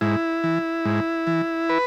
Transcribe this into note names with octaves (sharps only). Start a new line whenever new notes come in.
G#2 E4
E3
G#2
E3
B4